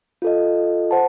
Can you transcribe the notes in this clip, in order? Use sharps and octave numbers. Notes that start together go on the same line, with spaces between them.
F4 A4 D#5
C5 F#5 A5